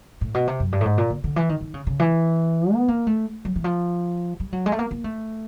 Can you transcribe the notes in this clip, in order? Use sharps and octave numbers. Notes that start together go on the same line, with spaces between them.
A2
B2
C3
F#2
G2
A2
G#2
A#2
D3
D3
E3
D#3
D#3
C#3
C#3
E3
B3
A#3
A3
F#3
E3
F3
G3
F#3
G#3
A3
A#3
A#3
A3